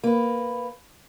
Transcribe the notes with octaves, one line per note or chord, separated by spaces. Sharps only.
A#3 B4